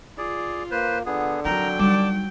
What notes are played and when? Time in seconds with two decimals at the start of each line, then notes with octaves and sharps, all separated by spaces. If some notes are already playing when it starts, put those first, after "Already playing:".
0.18 F4 G#4 D5
0.71 A#3 B4 C5
1.06 D3 B3 G#4
1.45 F#3 C4 A#4 G5 A#5
1.79 G3 D#4 D5 A5 D6